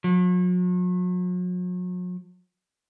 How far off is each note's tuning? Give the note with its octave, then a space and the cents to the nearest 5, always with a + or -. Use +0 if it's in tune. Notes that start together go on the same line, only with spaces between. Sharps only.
F#3 -45